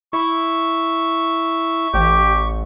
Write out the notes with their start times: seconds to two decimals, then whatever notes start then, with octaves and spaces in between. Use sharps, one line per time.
0.13 E4 C#6
1.94 A1 G4